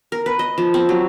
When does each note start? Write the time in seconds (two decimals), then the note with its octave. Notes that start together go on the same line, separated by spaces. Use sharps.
0.12 A#4
0.26 B4
0.39 D#5
0.58 F3
0.74 C4
0.89 F#3